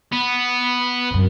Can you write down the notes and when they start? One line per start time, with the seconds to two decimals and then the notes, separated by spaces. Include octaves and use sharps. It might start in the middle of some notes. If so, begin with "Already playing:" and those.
0.12 B3
1.11 F#2 C3